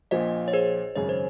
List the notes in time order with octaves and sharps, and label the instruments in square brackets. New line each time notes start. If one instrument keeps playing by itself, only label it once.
[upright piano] A#1 A#2 F3 [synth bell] C5 D#5
[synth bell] C#5
G#4 C5
[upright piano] G#1 F#2 C#3 G#3 [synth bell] C#5
[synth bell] C5